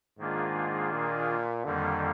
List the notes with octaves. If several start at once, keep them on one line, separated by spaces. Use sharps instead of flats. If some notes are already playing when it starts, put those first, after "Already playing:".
G#2 D#3 A#3 D4 F4 G#4
A#2
F2 D3 D#3 G3 A#3